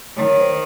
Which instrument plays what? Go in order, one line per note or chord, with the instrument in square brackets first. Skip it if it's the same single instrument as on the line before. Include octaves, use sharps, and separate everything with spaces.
[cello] D#3 [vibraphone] C#5
[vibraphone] C5